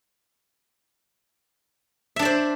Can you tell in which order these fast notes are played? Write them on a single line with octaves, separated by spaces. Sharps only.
E5 D4 D5 C5